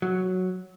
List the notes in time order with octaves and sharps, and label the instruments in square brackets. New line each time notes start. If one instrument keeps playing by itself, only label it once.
[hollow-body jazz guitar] F#3